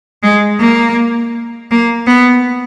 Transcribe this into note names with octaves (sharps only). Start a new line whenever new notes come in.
G#3
A#3
A#3
B3